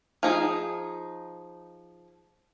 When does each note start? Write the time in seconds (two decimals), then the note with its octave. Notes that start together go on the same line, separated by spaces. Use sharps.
0.23 F3 D#4 G#4